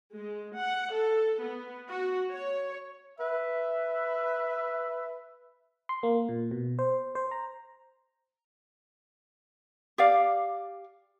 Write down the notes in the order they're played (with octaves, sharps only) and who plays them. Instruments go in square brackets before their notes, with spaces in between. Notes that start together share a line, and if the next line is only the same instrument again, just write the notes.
[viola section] G#3
F#5
A4
B3
F#4
C#5
[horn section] B4 E5
[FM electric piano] C6
A#3
A#2
B2
C5
C5
A#5
[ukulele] G4 D5 F5